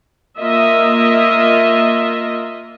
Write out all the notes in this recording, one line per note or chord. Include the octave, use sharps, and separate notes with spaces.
A#3 F4 D#5 E5